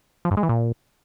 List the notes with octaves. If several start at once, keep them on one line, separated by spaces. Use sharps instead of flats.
F3
G2
G#3
E3
A#2